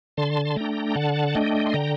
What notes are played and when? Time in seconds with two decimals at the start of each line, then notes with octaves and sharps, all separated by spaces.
0.17 D3 A5 C6
0.45 C6
0.56 A3 D4 G5 A#5
0.95 D3 F#5 A5
1.35 A3 D4 D#5 G5
1.66 C6
1.74 D3 G5 A#5